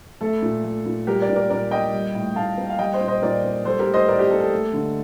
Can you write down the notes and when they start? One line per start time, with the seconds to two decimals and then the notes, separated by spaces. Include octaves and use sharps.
0.21 A3 A4
0.42 A#2
0.64 A3
0.86 A#2
1.07 G3 G4 A#4
1.22 A#4 D5
1.29 A#2
1.36 A#4 D5
1.50 A#2 A#4 D5
1.71 A#3 D#5 G5
1.93 G3
2.15 A2
2.36 A2 F5 A5
2.58 A#3
2.70 F5
2.79 G3 D#5 G5
2.93 C5 D#5
3.01 A#2
3.08 C5 D#5
3.22 A#2 A#4 D5
3.44 A#3
3.65 G3 A4 C5
3.79 G4 A#4
3.87 A2
3.94 C5 D#5
4.08 A2 A#4 D5
4.19 G4
4.30 A#3 A4
4.40 A4
4.51 A3
4.73 D3